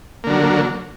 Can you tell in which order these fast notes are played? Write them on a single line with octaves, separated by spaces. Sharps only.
A#3 D3 F#3